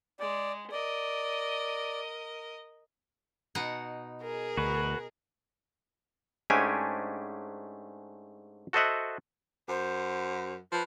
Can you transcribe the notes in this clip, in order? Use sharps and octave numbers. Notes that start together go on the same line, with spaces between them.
G#3 D5
A#4 D5 D#5
B2 D#4 F#5
G#4 A#4
D2 F#4 B4
G#2 A3 C#4 D4 G4 G#5
F#4 A4 C5 D#5 E5 F#5
F#2 C5
F3 B4